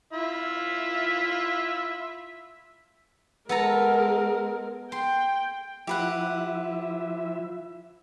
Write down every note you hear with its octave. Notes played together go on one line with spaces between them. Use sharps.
E4 F4 E5
G#3 B3 A4 A#4 A#5
G5 C6
F3 E4 G4 B4 E5 F#5